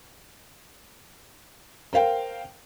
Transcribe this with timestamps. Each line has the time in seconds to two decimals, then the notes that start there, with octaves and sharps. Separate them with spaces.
1.93 A#4 C5 F5 G5